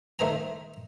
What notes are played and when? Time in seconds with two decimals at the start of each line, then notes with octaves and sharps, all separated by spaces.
0.19 D#3 A3 C5 D#5 G#5 A#5